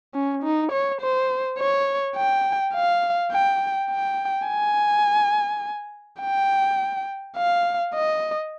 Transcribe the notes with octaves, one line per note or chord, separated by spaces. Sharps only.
C#4
D#4
C#5
C5
C#5
G5
F5
G5
G5
G#5
G5
F5
D#5